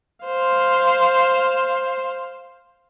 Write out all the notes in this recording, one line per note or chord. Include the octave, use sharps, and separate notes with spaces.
C5 F5